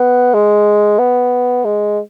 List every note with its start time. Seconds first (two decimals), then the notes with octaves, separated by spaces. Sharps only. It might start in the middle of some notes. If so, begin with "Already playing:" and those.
Already playing: B3
0.34 G#3
0.99 B3
1.65 G#3